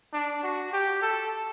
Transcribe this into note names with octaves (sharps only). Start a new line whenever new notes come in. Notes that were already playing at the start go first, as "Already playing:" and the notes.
D4
F#4
G4
A4